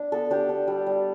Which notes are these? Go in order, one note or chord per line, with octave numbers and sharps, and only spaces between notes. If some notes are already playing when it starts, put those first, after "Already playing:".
Already playing: D4
B3 A4
D4 G4
D4
G3
G3